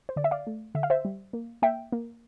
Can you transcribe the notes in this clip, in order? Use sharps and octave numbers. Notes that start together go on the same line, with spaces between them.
C5
D3 D5
E5
D5 F5
A3
D3 E5
F5
C5 E5
G3
A#3
A#3 E5 G5
A#3